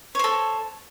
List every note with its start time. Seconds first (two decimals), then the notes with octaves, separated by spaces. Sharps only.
0.15 C#5
0.19 C5
0.24 A4